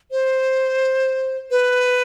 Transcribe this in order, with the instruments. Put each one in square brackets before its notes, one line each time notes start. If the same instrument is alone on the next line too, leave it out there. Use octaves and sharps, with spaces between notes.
[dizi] C5
B4